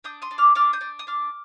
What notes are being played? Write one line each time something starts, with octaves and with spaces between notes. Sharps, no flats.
D4 D#6 G6
C6 D#6
D4
D6 F6
D4 D6 F6
D#6 G6
D4
D#6
D4 D6 F6